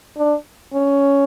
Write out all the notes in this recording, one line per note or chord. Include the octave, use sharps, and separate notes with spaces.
D4
C#4